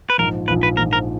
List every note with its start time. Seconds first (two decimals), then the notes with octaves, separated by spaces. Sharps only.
0.10 B4
0.18 A#1 G#2 F3 A#4
0.48 A#1 G#2 F3 B4
0.63 B4
0.77 A#1 G#2 F3 A#4
0.93 A#4